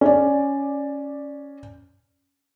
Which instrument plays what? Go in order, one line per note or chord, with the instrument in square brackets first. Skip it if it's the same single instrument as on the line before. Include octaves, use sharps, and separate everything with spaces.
[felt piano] C#4 D5